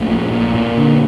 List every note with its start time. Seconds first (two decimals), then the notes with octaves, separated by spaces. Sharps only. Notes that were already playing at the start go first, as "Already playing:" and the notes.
Already playing: A#1 A3
0.08 A#2
0.31 A#2
0.54 A#2
0.77 D3